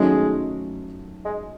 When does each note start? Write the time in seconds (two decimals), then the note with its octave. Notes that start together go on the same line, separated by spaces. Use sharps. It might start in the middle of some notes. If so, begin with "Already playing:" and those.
Already playing: D#3 F#3 G#3 A3 C#4
1.25 G#3